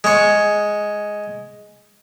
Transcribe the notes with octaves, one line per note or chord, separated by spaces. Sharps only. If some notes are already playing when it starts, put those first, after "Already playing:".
G#3 C#5